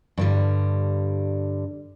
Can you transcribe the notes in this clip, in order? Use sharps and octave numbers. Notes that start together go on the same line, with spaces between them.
G2 D3 G3